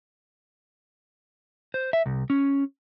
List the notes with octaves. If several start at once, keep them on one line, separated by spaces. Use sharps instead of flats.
C5
E5
C2
C#4